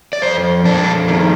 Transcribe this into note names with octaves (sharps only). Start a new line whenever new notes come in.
D5
F2 C5
F2 D4
D#3